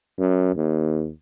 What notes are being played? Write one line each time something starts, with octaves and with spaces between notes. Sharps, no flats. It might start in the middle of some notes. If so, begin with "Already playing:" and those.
F#2
D#2